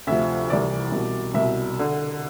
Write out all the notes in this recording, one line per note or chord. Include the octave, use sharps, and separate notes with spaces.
D2 C3 F3 E5
C2 C3 E3 D5
C2 B2
C2 B2 E5
D3